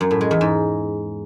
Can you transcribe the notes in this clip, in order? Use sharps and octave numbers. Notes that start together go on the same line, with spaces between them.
F#2
A2
G#3
E2
G#2